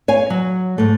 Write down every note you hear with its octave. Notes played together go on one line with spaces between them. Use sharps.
C#5 F5 G#5
F#3
G#2 A3